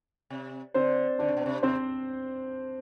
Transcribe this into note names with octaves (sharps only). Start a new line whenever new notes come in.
C3
D3 C4 C5
D3 D4 D5
C3
B2
C3
C3 C4 C5